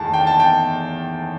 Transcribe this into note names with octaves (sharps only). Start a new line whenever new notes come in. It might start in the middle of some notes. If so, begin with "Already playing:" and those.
Already playing: E2 D#3 A3 A5
G5
A5
G5